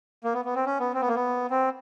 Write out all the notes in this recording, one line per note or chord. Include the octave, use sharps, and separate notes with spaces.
A#3
B3
B3
C4
C#4
B3
C4
B3
A#3
B3
C4